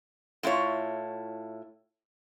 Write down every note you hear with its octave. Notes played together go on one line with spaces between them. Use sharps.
A2 E4 F4 C#5